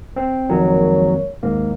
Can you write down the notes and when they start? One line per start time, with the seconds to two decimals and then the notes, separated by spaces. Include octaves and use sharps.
0.16 C4
0.49 F2 G#2 D#3 F#3 A#3 C#5
1.43 D#2 G#2 A#3